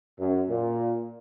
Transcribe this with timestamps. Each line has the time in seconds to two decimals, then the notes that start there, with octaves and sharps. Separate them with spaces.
0.19 F#2
0.49 A#2